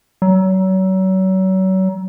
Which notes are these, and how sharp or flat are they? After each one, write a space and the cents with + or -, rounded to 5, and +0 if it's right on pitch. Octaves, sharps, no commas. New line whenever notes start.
F#3 +35